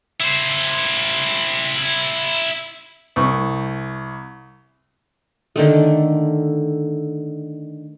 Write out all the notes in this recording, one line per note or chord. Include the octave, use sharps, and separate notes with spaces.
E4 C5
C2 C#6
D3 D#3 A3